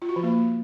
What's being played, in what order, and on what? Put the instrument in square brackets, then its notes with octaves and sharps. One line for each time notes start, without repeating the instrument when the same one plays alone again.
[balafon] F4
F#4
F3
A#3